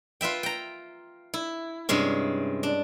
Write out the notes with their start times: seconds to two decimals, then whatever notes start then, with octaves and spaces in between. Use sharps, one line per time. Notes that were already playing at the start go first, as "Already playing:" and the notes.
0.21 F4 B4 E5 G5
0.43 G5 A#5
1.34 E4
1.89 G2 C3 G#3 C#4
2.63 D4